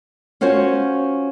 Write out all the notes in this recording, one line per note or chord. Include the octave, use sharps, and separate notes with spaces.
C#4 F4 F#4 C5 C#5